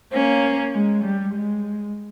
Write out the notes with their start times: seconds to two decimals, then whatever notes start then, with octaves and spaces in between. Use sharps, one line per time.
0.13 A#3 C#4
0.73 G#3
1.04 G3
1.35 G#3